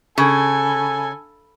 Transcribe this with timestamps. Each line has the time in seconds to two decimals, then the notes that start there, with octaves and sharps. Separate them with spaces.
0.18 C#3 A4 G#5